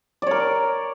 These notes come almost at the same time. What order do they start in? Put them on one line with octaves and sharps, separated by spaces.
D5 C#5 A#4